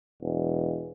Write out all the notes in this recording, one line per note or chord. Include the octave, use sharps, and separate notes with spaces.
E1